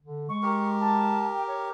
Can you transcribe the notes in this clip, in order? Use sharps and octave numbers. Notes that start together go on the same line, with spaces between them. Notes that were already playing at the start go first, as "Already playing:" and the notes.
D3
G#3 C#6
G4 A#4
A5
G5
C#5